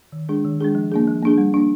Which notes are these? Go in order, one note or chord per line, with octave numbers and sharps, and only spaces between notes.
D#3
G#3 D4 G#4
D#3
G#3 D4 G#4
F3
A#3 D4 G#4
F3
A#3 D4 G#4
G3
A#3 D4